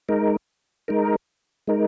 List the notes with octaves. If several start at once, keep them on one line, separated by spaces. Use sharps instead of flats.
G#3 D#4 A#4
G#3 D#4 A#4
G#3 D#4 A#4